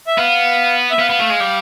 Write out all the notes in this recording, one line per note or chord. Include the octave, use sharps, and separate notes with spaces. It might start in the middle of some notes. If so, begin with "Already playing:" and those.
E5
B3 F5
E5
B3 F5
B3
A3
G#3
G3